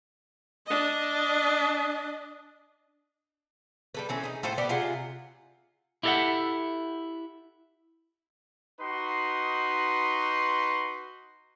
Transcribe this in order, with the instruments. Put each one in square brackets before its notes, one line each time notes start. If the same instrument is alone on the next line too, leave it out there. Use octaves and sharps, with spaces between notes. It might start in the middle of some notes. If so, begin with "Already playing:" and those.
[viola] D4 D#5
[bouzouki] G3 A4 B4
E3 C4 C#4
D#4 G#4
A2 F4 A4 C5
B3 G4 D5
C3 F4 G#4 F#5
[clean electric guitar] E4 G4 A4 D5 E5 F#5
[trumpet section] D#4 F#4 B4 C6